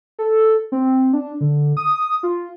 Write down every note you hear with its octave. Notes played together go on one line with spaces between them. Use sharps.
A4
C4
D4
D3
D#6
F4